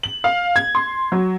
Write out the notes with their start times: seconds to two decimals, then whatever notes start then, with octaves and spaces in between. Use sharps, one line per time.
0.03 F#7
0.24 F5
0.56 G#6
0.75 C6
1.12 F#3